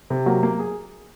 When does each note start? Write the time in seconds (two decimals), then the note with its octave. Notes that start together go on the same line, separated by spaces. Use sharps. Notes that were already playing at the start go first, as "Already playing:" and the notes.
0.10 C3
0.26 F#3 A#3
0.43 A#3
0.59 G#4